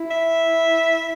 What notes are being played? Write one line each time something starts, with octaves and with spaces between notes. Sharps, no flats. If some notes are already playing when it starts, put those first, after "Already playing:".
Already playing: E4
E5